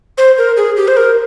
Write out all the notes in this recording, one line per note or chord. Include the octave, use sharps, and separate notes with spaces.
C5
A#4
G#4
G4
C5
A#4